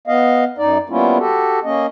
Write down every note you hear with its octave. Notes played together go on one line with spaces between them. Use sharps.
B3 D#5 F5
F#2 D#4 D5
G3 A#3 B3 C#4 E4 F4
F#4 G4 A4
A#3 C#4 D#5